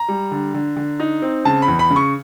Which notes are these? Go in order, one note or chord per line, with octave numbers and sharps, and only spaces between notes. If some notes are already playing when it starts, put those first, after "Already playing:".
Already playing: A#5
G3
D3
D3
D3
D#4
C4
C#3 A5
B5
E2
B5
C#3
C#6